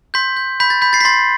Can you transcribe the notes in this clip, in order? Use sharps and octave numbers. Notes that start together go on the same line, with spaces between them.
C6 G6 B6
G6
B5 G6 B6
A6
B5 G6 B6
A6 C7
B6
C6 A6 C7